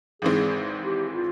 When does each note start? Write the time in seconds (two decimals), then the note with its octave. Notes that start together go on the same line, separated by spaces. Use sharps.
0.22 G#1 G#2 E3 G#3 C4 G#4
0.84 G4
1.15 F4